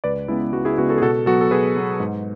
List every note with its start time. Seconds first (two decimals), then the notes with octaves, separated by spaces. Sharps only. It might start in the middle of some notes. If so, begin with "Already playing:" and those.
0.04 C#2 B4 D5
0.28 C#3 G#3 B3 E4
0.53 C#2 F#4
0.65 E4 G#4
0.78 C#3 G#3 B3 F#4
0.89 F#4 A4
0.98 G#4
1.01 B2 F#4 A4
1.26 F#3 B3 F#4 A4
1.41 A4
1.51 B2 G#4 B4
1.76 F#3 B3
2.00 G#2